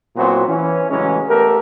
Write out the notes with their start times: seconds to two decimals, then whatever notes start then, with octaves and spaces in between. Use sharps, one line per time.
0.17 A#2 F#3 B3 C4 E4 F#4
0.47 E3 C#4
0.90 A1 C#3 E3 F#3 G#3 C#4
1.28 A3 B3 G4 A4 A#4